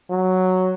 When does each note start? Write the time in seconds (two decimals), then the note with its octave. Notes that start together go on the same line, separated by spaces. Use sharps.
0.10 F#3